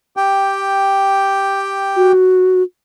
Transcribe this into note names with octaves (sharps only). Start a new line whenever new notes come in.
G4 G5
F#4